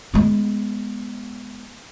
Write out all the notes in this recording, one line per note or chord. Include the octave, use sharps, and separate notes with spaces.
G#3 B3